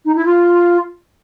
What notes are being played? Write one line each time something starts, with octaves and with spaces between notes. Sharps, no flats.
D#4
E4
F4